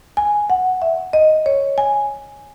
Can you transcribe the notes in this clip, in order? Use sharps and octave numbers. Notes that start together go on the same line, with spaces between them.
G#5
F#5
E5
D#5
C#5
G#5